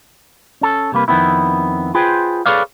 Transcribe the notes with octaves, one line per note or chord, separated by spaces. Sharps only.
C#4 A4
C3 G3 A#3 B4
F2 D#3 A3 B3 C4 E4
F4 G#4 B4 C5 G5
G#4 A4 B4 C#5 D5 F5